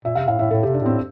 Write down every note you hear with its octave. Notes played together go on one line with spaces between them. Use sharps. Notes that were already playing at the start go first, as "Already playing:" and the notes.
A#2 E5
C3 F5
A2 F5
A2 E5
A2 A4
C3 G4
D4
A2 C4